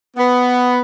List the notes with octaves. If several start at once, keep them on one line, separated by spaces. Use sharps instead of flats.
B3